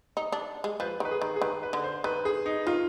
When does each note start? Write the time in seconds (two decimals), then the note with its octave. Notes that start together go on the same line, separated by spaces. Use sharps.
0.17 D#4
0.32 D4
0.64 G#3
0.80 F3 B4
1.00 D#3 B4
1.11 G#4
1.22 D#3
1.36 G#4
1.42 D#3 B4
1.63 B4
1.73 D3
1.84 C5
2.04 D#3 B4
2.25 G#4
2.46 D#4
2.67 D#3 F4